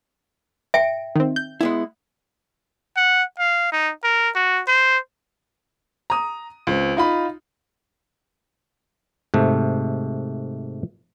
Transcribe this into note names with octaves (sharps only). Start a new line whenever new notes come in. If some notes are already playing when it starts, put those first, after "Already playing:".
E5 G5 D7
D#3 C4
G6
G#3 B3 E4
F#5
F5
D#4
A#4
F#4
C5
A#5 D#6
C#2 C4
D#4 F4 B5
G#2 C3 A3